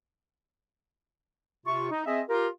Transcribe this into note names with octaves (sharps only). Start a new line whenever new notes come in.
C3 F4 C#6
D#4
C4 G#4 D#5 E5
F4 G4 A#4